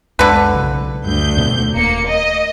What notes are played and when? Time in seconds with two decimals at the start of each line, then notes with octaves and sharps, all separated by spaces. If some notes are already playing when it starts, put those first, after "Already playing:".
0.19 C#2 F#2 D3 G#3 B4
0.54 B1 C#3
1.04 D2 G2 G6
1.37 F2 B2 A3
1.75 D#1 A#3 C#7
2.08 D#5